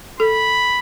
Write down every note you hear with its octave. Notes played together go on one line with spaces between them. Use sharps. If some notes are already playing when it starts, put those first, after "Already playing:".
A4 B5